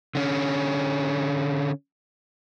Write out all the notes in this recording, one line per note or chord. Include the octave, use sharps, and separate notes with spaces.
D3 C#4